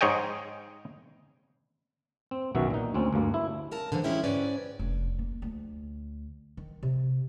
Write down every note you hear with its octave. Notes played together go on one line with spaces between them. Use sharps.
G#2 G#4 C#5 D#5 G5 G#5
C4
B1 F#2 B2 D#3 F#4 E5
A#2 D#4
D2 C4 C#4
D2 G2 A#3
E4
C#3 A#4 A5
D3 E3 F3 G#3
G#3 C#4 E4 G4
G#2 C#4 B4 D5
F1
A#3
D2
D#3
C3